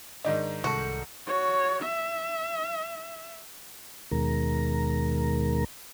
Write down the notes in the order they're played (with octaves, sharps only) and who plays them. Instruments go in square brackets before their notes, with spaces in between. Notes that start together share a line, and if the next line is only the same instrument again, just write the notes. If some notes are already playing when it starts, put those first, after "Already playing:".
[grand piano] G#2 D#3 D4 [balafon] D#5
[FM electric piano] C2 A4 [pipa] F#4
[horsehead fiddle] F#4 C#5
E5
[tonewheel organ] D#2 B2 D#3 G#3 A#4 A#5